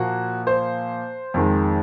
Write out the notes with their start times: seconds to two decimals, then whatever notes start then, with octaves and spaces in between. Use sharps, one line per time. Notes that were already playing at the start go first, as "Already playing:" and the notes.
Already playing: A#2 F3 A#3 F#4
0.47 C5
1.34 F2 D#3 G#3